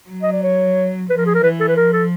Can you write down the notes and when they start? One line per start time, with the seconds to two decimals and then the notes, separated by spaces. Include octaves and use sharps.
0.09 F#3
0.22 D#5
0.32 D5
0.43 C#5
1.09 F3 B4
1.17 A#4
1.26 G#4
1.34 A#4
1.43 E3 B4
1.60 A4
1.68 B4
1.76 F3 A#4
1.93 A4